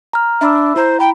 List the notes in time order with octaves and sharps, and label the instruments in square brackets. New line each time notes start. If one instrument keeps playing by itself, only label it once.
[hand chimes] A#5 F6
[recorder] D4 [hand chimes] E5 B5 E6
[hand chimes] E4 A#5 [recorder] C5
[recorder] G5 [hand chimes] B5